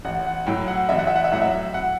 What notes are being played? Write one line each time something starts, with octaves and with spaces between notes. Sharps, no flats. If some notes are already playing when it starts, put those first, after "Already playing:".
A1 F#5
F#5
A2 F#3 G5
F#5
A1 E5
F#5
E5
F#5
E5
A2 F#3 F#5
E5
F#5